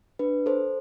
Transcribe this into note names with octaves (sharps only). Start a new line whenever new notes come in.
D4 B4
A4 C5